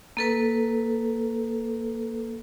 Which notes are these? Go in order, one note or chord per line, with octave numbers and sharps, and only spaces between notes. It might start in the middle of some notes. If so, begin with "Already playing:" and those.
A#3 A4 B4